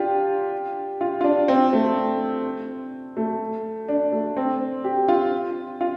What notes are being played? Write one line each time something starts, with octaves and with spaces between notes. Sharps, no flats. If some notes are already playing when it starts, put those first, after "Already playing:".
Already playing: D4 F4 G4
F4
F4
D4
C4
A3
A3
D4
A3
C4
G4
F4
F4